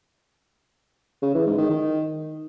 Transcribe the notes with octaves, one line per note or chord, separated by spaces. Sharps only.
C#3
E3
G#2
D#3
D#3